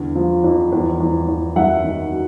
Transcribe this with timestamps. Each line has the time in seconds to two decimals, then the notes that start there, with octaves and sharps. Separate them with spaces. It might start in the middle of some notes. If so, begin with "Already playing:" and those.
Already playing: E2 D3
0.15 F3
0.44 F2
0.72 E2
1.00 E2
1.28 E2
1.56 F#2 E5 F#5
1.84 D#3
2.12 F#3